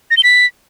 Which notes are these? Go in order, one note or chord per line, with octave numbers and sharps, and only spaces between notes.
A#6
G7
B6